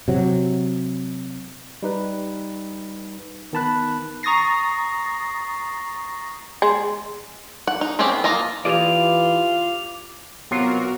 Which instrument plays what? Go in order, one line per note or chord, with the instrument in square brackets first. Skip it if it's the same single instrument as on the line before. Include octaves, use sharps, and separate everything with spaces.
[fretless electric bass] C3 F#3
[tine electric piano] G3 D#4 B4
D#3 B3 A5 B5 F#6
[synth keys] A#5 C#6 D#6 A6 A#6 C7
[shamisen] G#3
[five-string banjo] F#5
D#4
A3 C4 C#4 G4 G#4
B3
A#3 F4 A#4 D#5
[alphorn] E3 [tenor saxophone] F4 [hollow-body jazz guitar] G4 G#4 D5 [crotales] D6 F7
[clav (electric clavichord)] C3 F#3 F4 [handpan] B3 [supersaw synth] F#4 A#4